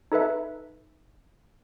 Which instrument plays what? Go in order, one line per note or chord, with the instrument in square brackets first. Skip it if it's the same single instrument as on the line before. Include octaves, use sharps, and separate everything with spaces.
[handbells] D#4 A4 B4 E5